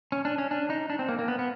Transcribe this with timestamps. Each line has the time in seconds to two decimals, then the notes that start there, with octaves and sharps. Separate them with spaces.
0.12 C#4
0.25 D4
0.38 C#4
0.51 D4
0.70 D#4
0.90 D4
0.99 C4
1.09 A#3
1.19 A#3
1.28 B3
1.39 B3